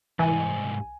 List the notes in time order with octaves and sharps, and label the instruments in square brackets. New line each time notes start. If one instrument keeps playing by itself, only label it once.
[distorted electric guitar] C2 G#2 [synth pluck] E3 [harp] G#5